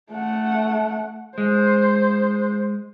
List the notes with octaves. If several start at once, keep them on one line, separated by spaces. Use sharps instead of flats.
A3 F#5
G#3 C5